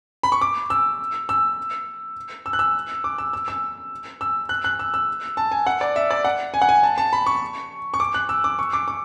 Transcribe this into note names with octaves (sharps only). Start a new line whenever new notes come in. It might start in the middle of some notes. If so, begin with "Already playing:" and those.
B5
C#6
D6
E6
E6
E6
F#6
E6
D6
E6
E6
E6
E6
F#6
F#6
E6
E6
A5
G#5
F#5
D5
E5
D5
F#5
G#5
F#5
G#5
A5
A5
B5
C#6
C#6
D6
F#6
E6
D6
C#6
D6
D6